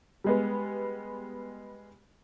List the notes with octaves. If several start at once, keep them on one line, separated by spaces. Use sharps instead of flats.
G3 G#3 B3